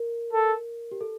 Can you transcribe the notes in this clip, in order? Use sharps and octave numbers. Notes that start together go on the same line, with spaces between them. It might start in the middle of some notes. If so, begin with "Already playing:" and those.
Already playing: A#4
A4
G4
A4